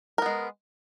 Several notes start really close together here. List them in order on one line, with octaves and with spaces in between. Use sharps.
A#4 B3 G#3